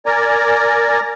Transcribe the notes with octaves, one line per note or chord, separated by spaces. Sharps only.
A#4 D5 G#5 A#5